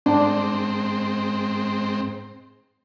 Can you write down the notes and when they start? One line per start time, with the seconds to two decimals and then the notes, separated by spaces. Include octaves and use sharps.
0.06 G#2 C4 D4